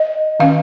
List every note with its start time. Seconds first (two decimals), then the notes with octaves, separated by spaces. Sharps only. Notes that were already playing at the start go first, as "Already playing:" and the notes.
Already playing: D#5
0.40 D#3 C#4 F5